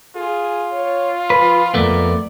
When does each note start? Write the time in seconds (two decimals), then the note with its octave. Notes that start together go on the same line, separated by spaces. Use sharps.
0.16 F4 G#4
0.72 C#5
1.30 F3 B4
1.74 F2 A#2 A3 B3 D5